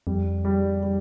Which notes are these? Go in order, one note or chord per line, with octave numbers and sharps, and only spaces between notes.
F2 G3
G3
G3